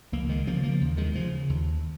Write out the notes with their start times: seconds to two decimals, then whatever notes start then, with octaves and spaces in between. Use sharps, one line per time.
0.12 C#2 F3 A#3
0.29 D#3 G#3
0.47 C#3 F3 A#3
0.63 F3 A#3
0.81 D#2
0.97 D#3 G#3
1.15 C#3 F3
1.50 D#2